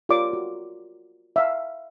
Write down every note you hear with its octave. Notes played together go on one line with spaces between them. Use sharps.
F4 G4 A#4 C#5 D5 D6
F#4
E5 F5